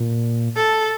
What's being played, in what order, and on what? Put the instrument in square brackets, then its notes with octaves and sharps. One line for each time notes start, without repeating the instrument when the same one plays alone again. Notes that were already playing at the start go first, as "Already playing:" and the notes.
Already playing: [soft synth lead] A#2
[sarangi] A4